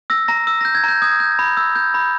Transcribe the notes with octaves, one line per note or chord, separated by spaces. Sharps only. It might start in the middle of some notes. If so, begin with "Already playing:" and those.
E6 A#6
A#5 A#6
E6
G6 A#6
G#6
A#5 G6
D#6 G#6
G6
B5
E6
G6
B5